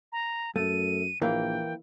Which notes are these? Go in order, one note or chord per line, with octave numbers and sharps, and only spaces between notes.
A#5
F#2 A3 D#7
A#1 E3 A#3 G5